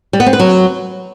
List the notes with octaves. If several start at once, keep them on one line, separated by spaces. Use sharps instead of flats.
G3
B3
C4
B4
F#3